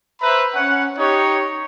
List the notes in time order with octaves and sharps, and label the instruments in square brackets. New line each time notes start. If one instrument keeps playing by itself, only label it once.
[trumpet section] B4 C5 E5 A#5 B5
C#4 F#5
D#4 G4 C#5